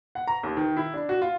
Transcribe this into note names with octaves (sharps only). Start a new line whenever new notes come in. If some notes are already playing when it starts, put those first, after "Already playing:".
F#5
A#5
D#2
D#3
E4
D4
F#4
F4